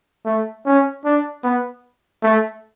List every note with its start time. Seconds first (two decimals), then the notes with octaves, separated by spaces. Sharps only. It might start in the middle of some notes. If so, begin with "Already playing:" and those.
0.25 A3
0.66 C#4
1.05 D4
1.44 B3
2.23 A3